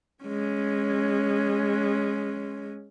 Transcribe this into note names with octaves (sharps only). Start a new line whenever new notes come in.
G#3 C#4